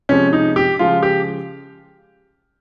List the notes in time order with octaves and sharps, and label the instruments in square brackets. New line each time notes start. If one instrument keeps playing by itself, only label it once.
[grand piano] C3 F3 G#3 C#4
D#4
G4
C#3 F3 G#3 F4
G4